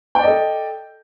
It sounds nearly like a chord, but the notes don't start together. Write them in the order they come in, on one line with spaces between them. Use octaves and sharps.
G5 D5 D#5 A4